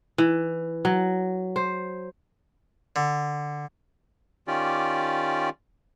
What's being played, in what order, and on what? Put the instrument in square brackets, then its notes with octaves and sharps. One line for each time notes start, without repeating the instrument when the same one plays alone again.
[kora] E3
F#3
C5
[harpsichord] D3
[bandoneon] D#3 C#4 F4 G4 D5